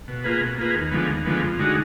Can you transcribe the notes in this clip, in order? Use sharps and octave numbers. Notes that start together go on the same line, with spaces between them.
B2
A#3 F4 G#4 B4
B2
A#3 F4 G#4 B4
D#2
D3 F3 G#3 B3
D#2
D3 F3 G#3 B3
F2
D3 G#3 D#4 F#4